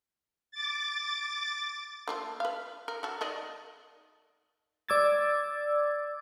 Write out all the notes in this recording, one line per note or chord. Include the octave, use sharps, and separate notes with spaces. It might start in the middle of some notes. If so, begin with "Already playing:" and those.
D6 A6
A#3 F4 A4
B4 F5
A#4
F#4 A4
D#3 D5 D#5
D5 D6 E6 G#6 A6